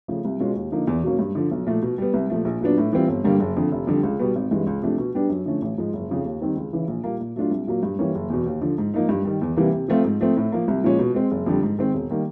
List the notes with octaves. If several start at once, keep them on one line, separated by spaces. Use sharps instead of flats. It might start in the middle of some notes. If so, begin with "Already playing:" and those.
C#3 F3 A3
C2
B2 G#3 C#4 F4
D#2
D3 F3 A#3 D#4
E2
B2 F#3 A#3 C#4
G2
D3 F3
B1
A#2 F3 A3
B2
G3 B3
C2
A#2 F3 A3
A#1
A#2 F#3 B3 D4
A2
E3 G3 C4 F4
G1
G2 D3 G3 A#3
F#1
F2 D3
F1
F2 D3 G3
C#2
B2 G3 B3
G#1
G2 E3 G#3
C#2
C3 F3 A3 D4
B2
G3 B3 D4 G4
F#2
D3 F3 A3 C#4
A1
G#2 F3 G#3
F#1
F2 C#3 F3
D#2
D#3 G3 C4 D#4
C#2
C#3 E3
A#1
A#2 G3 A#3
A#2
F#3 A3 D4 F4
C2
A#2 F#3 A#3
G2
E3 G3 A#3 C#4
F#1
E2 B2
D#2
D3 F3
G#2
F3 A#3 D#4
G2
D#3 G3
E2
C3 E3 G3 A#3
C3
F3 A3 C4 F4
G#2
F3 A3 C4
A2
F3 A#3
C2
A#2 F3 G#3 C#4
B2
G#3 C4
F#1
F2 D3 G3
G#2
D#3 G#3 C4
E1
D#3 G3 A#3